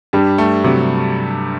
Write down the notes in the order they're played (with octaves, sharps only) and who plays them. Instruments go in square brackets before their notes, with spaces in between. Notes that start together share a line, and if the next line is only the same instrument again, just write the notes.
[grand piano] G2 [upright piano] G3
[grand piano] A3
[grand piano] C3 [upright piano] F#3